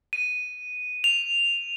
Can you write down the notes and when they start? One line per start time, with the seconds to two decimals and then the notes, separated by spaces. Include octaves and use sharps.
0.13 D#7
1.04 F7